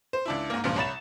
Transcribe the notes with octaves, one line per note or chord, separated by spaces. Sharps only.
C5
C#2 D4 E4
G#2 A#3
C#2 G2 A#2 F3
C2 C#5 B5 A6 E7